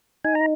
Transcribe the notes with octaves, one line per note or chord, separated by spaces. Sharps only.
D#4 G#5
A#5